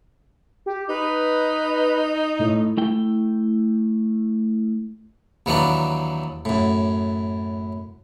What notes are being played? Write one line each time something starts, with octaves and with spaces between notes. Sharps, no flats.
G4
D#4 B4
A2
A3 E4 G5
D#2 D#3 E3 F#3 D4
F#2 A2